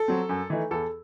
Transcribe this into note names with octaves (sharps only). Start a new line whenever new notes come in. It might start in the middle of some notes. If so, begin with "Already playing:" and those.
Already playing: A4
F#3 C4
F#2
E3 A3 D#4
E2 A4